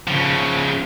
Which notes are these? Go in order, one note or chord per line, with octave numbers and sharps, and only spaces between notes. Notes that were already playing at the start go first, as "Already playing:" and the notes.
C#3 F3